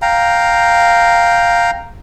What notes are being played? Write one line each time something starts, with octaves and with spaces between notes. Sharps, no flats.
F5 G5 A#5